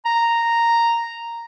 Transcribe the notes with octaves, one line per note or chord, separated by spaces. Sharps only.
A#5